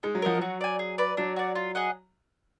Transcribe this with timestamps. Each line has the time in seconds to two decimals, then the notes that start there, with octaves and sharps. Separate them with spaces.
0.03 G#3 D#4
0.15 F#3
0.22 F3 A#4 D#5 F#5
0.38 F#3 F#4
0.61 D5 G#5
0.79 G#4
0.98 B4 D5
1.17 F#3 D4
1.36 F#4 D5
1.55 F4
1.75 G#4 D#5 F#5